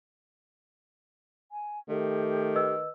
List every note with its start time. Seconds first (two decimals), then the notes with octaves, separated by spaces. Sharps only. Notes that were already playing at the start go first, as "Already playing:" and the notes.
1.52 G#5
1.89 D#3 A3 G4
2.56 B4 D#5 E6